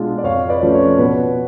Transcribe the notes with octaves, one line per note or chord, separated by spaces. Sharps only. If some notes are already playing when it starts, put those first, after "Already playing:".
Already playing: B2 G#3 D4 F4
D5
F2 C#5 F5
B4 D5
F3 A3 C#4
C#5
B2 B4